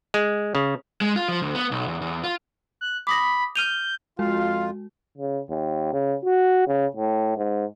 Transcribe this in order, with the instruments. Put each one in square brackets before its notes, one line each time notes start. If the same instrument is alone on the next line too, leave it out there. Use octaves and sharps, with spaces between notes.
[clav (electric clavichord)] G#3
C#3
[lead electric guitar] G#3
F4
F3
D2
B3
B1
E2
E2
F4
[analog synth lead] F#6
[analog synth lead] B5 [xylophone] D6 D#6 A#6
[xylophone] F6 D#7 F7 [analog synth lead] G6
[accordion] F2 F4 [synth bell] G#3 F#4 [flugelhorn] F5
[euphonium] C#3
D#2
C#3
F#4
C#3
A2
G#2